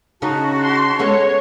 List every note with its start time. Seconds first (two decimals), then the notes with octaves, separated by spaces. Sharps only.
0.22 C#3 C#4 D#4 F#4 A5
0.62 C6
0.99 G#3 B3 A4 C#5